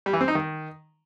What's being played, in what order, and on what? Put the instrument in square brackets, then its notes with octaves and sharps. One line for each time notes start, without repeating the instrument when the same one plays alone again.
[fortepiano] G3
E3
C4
D#4
D#3